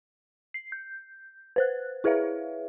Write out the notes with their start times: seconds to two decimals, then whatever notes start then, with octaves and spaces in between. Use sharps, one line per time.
0.54 C7
0.72 G6
1.56 B4 C5 F#6
2.04 E4 G#4 B4 C#5 E5 F5